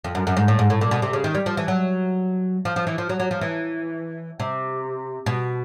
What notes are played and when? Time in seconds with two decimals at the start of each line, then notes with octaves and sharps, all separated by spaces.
0.04 F2
0.15 F#2
0.27 F#2
0.37 G#2
0.48 A2
0.59 G#2
0.70 A2
0.81 A#2
0.91 B2
1.02 C3
1.13 C#3
1.24 D#3
1.35 G3
1.46 F3
1.57 E3
1.68 F#3
2.65 F3
2.76 F3
2.87 E3
2.98 F3
3.09 F#3
3.20 F#3
3.31 F3
3.41 E3
4.40 C3
5.26 B2